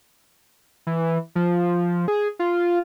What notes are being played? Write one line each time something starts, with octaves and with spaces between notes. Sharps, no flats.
E3
F3
G#4
F4